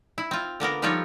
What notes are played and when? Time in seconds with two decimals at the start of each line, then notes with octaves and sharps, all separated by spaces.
0.18 E4
0.31 C4 F4
0.60 D3 A#3 B3 A#4
0.82 F3 G3 D#4 F4 A4 C#5